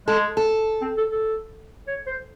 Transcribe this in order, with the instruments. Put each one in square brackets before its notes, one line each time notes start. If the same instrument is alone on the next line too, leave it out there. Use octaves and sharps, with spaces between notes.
[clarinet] G#3 [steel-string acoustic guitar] A4
[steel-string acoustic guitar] A4
[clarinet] C4
A4
A4
C#5
C5